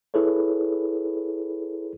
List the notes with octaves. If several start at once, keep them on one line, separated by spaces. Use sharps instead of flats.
E4 G#4 A4 B4 C#5